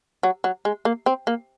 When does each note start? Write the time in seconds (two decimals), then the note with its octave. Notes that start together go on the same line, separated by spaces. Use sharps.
0.23 F#3
0.44 F#3
0.65 G#3
0.85 A#3
1.06 C4
1.27 A#3